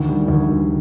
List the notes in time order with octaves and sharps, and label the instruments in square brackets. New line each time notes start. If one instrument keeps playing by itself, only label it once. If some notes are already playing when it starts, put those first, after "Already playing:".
Already playing: [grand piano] D2 D#3
G3
D2
D2